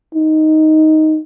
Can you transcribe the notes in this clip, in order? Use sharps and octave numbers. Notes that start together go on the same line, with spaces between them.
D#4